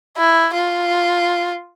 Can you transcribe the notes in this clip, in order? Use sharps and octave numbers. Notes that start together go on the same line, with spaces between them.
E4
F4